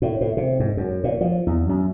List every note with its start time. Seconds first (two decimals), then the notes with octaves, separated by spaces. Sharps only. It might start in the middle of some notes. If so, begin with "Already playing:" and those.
0.02 A2
0.21 A2
0.37 C3
0.60 G#2
0.77 F#2
1.04 A#2
1.21 F3
1.47 E2
1.69 F#2